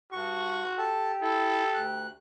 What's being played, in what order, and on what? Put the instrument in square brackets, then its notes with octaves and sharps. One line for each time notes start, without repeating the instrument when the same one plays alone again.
[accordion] G2 C#6 [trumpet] F#4
[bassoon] G4 [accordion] A4 A5
[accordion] E4 [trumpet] A4
[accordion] D2 F#6